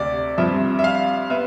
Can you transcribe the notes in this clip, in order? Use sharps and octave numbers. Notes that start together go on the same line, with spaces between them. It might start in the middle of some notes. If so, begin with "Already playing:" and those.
Already playing: D2 C3 D5
G2 F3 C4 E5
E5
F5
B3 E5